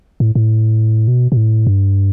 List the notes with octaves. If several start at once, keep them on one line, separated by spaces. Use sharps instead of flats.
A2
A2
B2
B2
A2
G2